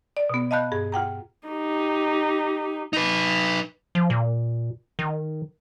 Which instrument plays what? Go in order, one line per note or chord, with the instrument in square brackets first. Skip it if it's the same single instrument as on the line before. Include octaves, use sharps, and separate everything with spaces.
[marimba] D5
B2 B3
D#5 F5 A5 B5 F#6 G6
G2 G#4
F4 F#5 G5 A#5
[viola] D#4 G4
[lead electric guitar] D#4 B4
[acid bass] F3
A#2
D#3